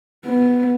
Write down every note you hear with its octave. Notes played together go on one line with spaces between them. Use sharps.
B3